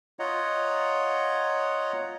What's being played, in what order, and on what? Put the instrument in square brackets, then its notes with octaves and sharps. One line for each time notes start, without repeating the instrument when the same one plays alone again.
[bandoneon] F4 C#5 D#5 F#5 A#5